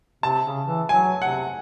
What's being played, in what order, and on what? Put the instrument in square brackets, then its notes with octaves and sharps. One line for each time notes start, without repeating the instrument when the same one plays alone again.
[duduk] C3 [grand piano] A5
[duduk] C#3
E3
[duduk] F#3 [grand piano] G#5
[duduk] C3 [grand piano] F#5